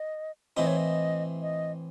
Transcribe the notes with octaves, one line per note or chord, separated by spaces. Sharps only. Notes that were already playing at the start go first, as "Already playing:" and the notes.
Already playing: D#5
A2 E3 C4 D#4 D#5
C#5
D#5
D#5